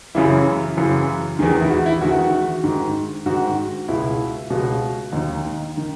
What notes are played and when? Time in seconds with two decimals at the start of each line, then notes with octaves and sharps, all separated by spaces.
0.15 F#2 C#3 E3 E4
0.77 F#2 C#3 E3
1.39 D#3 G#4
1.43 E2
1.61 E4
1.70 F#4
1.86 E4
2.02 E2 D#3 F#4
2.64 G#2 D#3
3.26 G#2 D#3 F#4
3.88 C#2 B2 E4
4.50 C#2 B2
5.12 D#2 D#3 D#4
5.77 D#3